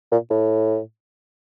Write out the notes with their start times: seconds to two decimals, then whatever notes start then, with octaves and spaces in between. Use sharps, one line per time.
0.12 A#2
0.30 A2